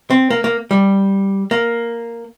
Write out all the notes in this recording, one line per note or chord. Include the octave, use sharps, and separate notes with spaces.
C4
A#3
A#3
G3
A#3